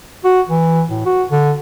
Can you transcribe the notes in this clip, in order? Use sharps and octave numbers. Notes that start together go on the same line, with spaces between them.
F#4
E3
A2
F#4
D3